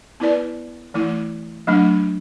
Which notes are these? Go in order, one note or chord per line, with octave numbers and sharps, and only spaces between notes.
B3 E4 B4 D5
E3 A3 E4
F#3 A3 D4